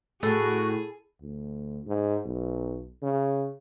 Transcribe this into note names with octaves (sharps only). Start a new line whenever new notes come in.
A2 F#4 G#4 A4
D2
G#2
B1
C#3